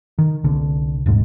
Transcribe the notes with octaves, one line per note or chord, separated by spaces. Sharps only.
D#3
C2 D3
D#1 G#2